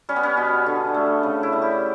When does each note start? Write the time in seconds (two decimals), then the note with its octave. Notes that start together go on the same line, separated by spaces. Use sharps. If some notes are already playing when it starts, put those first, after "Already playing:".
0.09 G3 C#4
0.16 B3
0.23 C#4
0.37 B2
0.66 D3
0.94 A3
1.23 C#3
1.43 E4
1.53 G3
1.62 G4